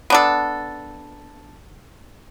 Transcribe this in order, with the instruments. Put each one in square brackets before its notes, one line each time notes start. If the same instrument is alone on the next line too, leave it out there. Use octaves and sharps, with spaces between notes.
[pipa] B3 D4 A4